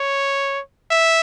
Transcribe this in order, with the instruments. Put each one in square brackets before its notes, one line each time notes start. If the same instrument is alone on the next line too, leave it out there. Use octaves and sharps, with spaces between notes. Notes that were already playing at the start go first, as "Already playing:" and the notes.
Already playing: [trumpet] C#5
E5